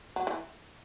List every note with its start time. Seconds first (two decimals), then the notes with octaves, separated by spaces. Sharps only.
0.16 F#3
0.27 E3